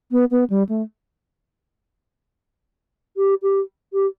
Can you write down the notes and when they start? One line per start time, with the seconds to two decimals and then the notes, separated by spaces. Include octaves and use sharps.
0.11 B3
0.31 B3
0.50 G3
0.69 A3
3.17 G4
3.42 G4
3.93 G4